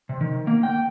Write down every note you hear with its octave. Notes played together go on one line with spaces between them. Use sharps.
C3
D#3
A#3
G5